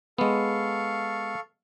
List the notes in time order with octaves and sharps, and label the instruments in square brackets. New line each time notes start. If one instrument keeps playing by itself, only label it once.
[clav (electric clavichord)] G#3 B3 [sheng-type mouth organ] A4 F5 C#6